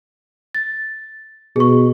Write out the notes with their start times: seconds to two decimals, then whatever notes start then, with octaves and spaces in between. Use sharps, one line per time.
0.55 A6
1.56 B2 G#4 C#6